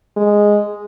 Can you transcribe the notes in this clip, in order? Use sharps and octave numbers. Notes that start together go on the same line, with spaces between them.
G#3